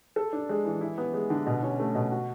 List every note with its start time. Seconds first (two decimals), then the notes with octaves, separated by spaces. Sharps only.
0.16 A4
0.33 D4
0.49 G#3
0.65 E3
0.81 E4
0.98 B3
1.14 G#3
1.30 D3
1.46 B2
1.63 C#4
1.80 A3
1.95 B2
2.12 F#4